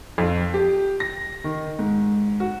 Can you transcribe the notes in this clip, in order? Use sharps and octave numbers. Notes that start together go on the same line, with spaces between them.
F2
G4
A#6
D#3
G#2
F#4